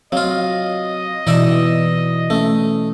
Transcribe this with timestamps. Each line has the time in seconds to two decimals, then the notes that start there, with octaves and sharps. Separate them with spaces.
0.12 F#3 C4 F4 D#5 F5
1.27 B2 E3 D#4 D5 E5
2.30 A3 C#4